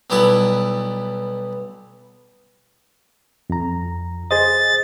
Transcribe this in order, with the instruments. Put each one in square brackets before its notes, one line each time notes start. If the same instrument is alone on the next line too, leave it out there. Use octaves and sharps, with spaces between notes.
[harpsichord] B1 G3 B3 E4 A5
[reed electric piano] F2 A#5
[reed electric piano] G#4 C5 D#5 [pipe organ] A6